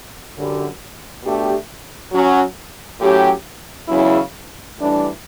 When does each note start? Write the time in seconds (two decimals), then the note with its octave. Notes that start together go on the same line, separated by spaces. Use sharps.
0.35 F#2 D3 G3
1.23 B2 A3 D4 G4
2.12 F#3 C#4 F#4
3.01 A2 F#3 C#4 G4
3.89 E2 C#3 F#3 C#4 E4
4.78 A2 E3 G3 D4